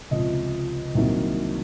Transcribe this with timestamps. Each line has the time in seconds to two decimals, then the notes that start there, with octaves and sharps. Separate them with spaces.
0.11 C#2 C3 F3 D#5
0.95 C2 C3 D#3 F#3 A#3